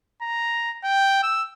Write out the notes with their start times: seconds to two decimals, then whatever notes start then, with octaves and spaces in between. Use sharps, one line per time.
0.22 A#5
0.84 G5
1.23 E6